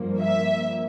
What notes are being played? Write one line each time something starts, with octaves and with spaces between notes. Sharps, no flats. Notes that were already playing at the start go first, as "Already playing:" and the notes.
Already playing: G2 F3 A#3
E5